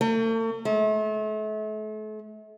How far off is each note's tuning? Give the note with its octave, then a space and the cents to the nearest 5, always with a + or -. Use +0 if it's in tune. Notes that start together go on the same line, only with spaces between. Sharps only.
A3 +45
A3 -40